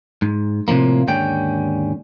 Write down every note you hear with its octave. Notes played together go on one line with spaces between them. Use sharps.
G#2
A2 C3 D#3 F3 A#3
D#2 G#2 D3 C#4 G5